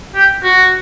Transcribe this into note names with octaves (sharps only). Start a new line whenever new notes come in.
G4
F#4